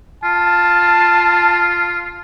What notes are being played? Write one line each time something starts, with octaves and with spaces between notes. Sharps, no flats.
F4 A5